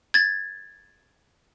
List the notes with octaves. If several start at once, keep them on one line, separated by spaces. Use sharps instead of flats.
G#6 A6